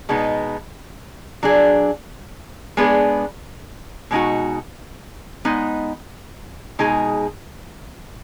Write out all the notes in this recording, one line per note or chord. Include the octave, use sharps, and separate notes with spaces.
B2 G#3 B3 D#4
F#3 D4 G#4
G#3 B3 D4 G#4
B2 G#3 D#4 F#4
G#3 B3 D#4
B2 G#3 D#4 G#4